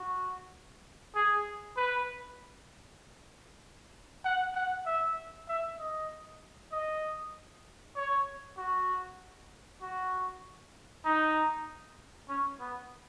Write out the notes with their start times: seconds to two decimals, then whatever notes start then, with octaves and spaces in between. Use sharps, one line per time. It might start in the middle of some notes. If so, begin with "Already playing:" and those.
Already playing: F#4
1.15 G#4
1.76 B4
4.25 F#5
4.55 F#5
4.86 E5
5.48 E5
5.79 D#5
6.72 D#5
7.96 C#5
8.57 F#4
9.81 F#4
11.05 D#4
12.29 C#4
12.60 B3